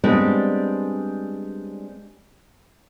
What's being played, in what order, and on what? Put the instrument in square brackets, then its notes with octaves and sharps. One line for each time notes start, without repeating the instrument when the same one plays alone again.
[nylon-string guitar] G3 G#3 B3 C4 D4